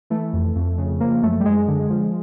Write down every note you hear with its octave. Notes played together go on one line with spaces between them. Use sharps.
E3 A3
F2
F2
C#3
F3 A#3
F#2 A3
G3
F#2 G#3
D3
F3